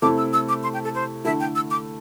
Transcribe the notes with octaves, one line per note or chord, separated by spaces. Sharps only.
C3 A3 E4 D6
E6
E6
D6
C6
G5
A4
C5
D3 A3 E4 E5
G5
E6
D6